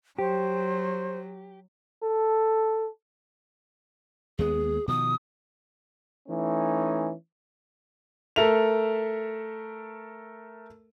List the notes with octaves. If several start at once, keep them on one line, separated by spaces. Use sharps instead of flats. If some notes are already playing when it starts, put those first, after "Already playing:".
F#3 G4 C5
A4
D#2 G#3 B3 G#4
B2 D#3 F3 D#6
E3 A3 C#4 D#4
A3 A4 A#4 E5 F7